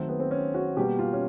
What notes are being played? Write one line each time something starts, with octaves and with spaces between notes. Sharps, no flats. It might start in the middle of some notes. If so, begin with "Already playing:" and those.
Already playing: D#3 F#3 A3 C4
B3
C4
C#4
F#4
B2 G3 A#3 G4
F4
C#4